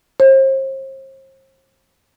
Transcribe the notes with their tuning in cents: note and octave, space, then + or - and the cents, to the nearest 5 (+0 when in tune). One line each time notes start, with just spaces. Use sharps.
C5 +40